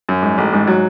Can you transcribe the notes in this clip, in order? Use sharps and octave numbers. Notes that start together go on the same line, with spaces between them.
F#2
G#2
A1
G#2
F#3